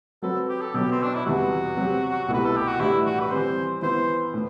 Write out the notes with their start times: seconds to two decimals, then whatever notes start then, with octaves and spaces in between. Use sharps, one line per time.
0.22 F#3 C4 F#4 A4 B4
0.49 G4
0.61 A4
0.74 B2 F#3 B3 G4
0.91 C4
1.03 D4
1.15 E4
1.26 E2 C3 E3 G3 F#4
1.77 C3 F#3 C4 G4
2.28 C2 B2 A3 E4 G4 B4
2.45 A4
2.57 G4
2.68 F#4
2.79 A2 E3 G3 D4 E4 G4
3.05 F#4
3.20 B4
3.31 E3 G3 C4 C5
3.82 E3 B3 E4 B4 C5
4.34 A2